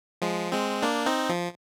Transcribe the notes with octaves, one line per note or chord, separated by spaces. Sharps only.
F3 G#3
G#3 C4
A#3 D4
C4 D#4
F3